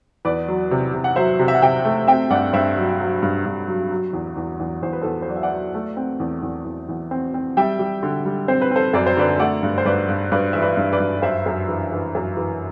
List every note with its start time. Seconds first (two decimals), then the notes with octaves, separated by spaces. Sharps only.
0.25 E2 B4 D5
0.48 F#3
0.71 C3
0.94 C3
1.04 F#5
1.16 F#3 C5 E5
1.40 C3
1.48 E5
1.55 F#5
1.62 C3 E5 G5
1.85 A3
2.07 C4 E5 G5
2.30 G2 D5 F#5
2.53 G2 C5 E5
2.77 F#3
3.00 F#3
3.23 G2
3.45 G2
3.67 F#3
3.91 F#3
4.13 E2
4.37 E2
4.60 E2
4.82 E2 C5
4.93 B4
5.02 E2 A4 C5
5.22 C5
5.28 F#3 D5
5.36 E5
5.43 D5 F#5
5.51 F#3
5.74 A3
5.97 C4
6.20 E2
6.43 E2
6.65 E2
6.89 E2
7.11 C4
7.34 C4
7.57 G3 E5 G5
7.79 G3
8.03 D3
8.25 G3
8.48 C4 C5
8.61 B4
8.71 C4 A4 C5
8.93 F#2 D5
9.06 C5
9.17 D3 B4 D5
9.40 A3 D5 F#5
9.63 G2
9.78 C5
9.85 G2 B4 D5
10.09 G2
10.32 G2 B4 D5
10.53 E3 E5
10.62 B4 D5
10.77 G2
10.93 B4 D5
11.00 G2
11.22 F#2 C5 E5
11.46 F#2
11.68 E3
11.92 E3
12.15 F#2
12.37 E3